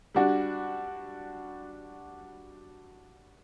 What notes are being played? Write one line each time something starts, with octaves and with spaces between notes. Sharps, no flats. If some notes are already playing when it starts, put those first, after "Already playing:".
G3 D4 F#4